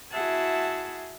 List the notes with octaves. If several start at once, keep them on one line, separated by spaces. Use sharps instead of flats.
E4 F#4 G#4 E5 F#5 A5